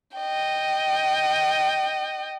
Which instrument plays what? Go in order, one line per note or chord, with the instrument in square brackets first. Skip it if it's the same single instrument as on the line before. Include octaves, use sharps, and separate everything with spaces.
[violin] D#5 G5